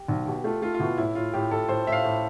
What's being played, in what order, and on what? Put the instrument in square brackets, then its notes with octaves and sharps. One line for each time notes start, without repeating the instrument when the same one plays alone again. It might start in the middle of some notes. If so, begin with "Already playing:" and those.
Already playing: [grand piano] G4
[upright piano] B1
[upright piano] B2 [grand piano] G4
[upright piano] A3 [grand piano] F4
[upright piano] A3 [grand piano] F4
[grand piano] F4
[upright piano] B2 [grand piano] E4
[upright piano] A2 [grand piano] E4
[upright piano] A2 [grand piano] F4
[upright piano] A2 [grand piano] G4
[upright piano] A2 [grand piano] A4
[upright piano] A2 [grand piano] C5
[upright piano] A2 [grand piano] E5
[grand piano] F5
[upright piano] A2